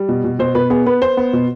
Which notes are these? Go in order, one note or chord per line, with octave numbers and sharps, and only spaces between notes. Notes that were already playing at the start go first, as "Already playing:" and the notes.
Already playing: G3
B2
B2
B2 C5
B2 B4
B3 G#4
B3 B4
B3 C5
B3
B2